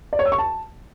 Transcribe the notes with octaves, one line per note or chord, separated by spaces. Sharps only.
D5
C#5
E6
C#6
A5